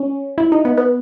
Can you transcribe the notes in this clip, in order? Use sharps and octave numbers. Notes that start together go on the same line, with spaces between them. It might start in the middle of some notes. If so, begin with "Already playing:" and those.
Already playing: C#4
E4
D#4
B3
B3